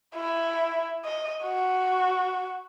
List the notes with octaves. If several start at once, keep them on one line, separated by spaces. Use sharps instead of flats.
E4
D#5
F#4